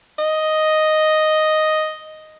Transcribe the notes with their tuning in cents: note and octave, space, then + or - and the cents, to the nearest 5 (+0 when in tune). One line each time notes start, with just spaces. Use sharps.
D#5 +0